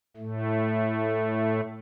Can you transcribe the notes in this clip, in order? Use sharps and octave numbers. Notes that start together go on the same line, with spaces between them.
A2 A3